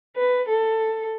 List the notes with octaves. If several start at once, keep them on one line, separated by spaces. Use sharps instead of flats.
B4
A4